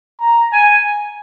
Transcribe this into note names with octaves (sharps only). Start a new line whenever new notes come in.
A#5
G#5